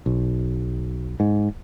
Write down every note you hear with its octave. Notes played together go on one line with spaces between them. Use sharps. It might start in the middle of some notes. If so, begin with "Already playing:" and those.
B1
G#2